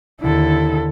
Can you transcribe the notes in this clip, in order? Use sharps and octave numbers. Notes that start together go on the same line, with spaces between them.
D#2 D3 E4 A4